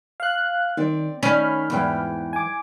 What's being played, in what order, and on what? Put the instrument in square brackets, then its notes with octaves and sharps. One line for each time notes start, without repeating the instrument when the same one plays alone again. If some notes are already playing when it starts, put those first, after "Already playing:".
[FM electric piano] F5 F#6
[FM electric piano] D#3 [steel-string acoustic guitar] C4 D5
[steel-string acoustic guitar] D#3 D#4 [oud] C#4 [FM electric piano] B5 F6
[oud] E2 [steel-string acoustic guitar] G#2 E3 G5
[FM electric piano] G#5 D6